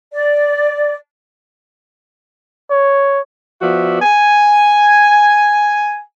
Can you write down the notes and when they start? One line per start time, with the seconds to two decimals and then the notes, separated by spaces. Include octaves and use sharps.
0.12 D5
2.71 C#5
3.62 F3 B3 F#4 D5 E5
4.02 G#5